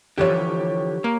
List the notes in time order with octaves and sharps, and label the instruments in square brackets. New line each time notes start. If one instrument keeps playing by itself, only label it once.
[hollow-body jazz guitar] D3 E3 F3 [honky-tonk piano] G4 C#5
[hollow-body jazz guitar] A#3